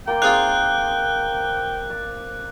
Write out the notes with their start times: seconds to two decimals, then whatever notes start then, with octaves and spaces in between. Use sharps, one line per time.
0.07 A#3 D5 G5 C6
0.22 C4 D#4 F4 G#4 D5 F5 F#6
1.90 D5